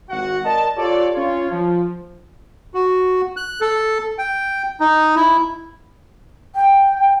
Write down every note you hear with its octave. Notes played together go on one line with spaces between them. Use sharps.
G#1 F#4 F#5
A#4 D5 D#5 A5
F4 G4 A4 C#5 D5
C#4 F4 C#5
F3
F#4
F#6
A4
G5
D#4
E4
G5